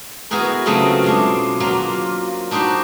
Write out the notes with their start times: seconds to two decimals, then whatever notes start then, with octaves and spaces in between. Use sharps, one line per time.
0.31 B3 E4 F#4 G#4 A#4
0.66 C#3 F#3 A3 C4 F4 D#5
1.04 B2 G#3 D4
1.60 F#3 A#3 F4
2.51 D4 D#4 F#4 G4 C5